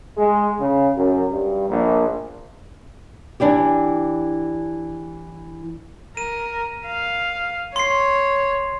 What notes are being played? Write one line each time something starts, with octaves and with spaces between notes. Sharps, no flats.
G#3
C#3
F#2
G2
A#1
E3 D4 E4 G4
A#4 D#7
F5
C#5 C6 C7